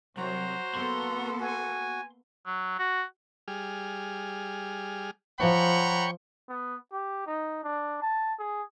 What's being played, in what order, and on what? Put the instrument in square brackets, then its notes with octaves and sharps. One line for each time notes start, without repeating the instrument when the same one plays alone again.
[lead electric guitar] C2 [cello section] F#3 [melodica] F#4 A#5 [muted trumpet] C5
[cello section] A#3 B3 A4 [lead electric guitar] C6
[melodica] F#4 [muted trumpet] G#5
[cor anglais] F#3
F#4
[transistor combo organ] G3 G#4 F6
[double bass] F3 [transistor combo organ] C#5 G5 C#6 [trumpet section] F#5 A#5 B5
[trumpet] B3
G4
D#4
D4
A5
G#4